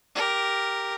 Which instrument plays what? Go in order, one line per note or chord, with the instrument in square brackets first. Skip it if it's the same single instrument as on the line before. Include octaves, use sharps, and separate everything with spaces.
[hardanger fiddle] G4 A#4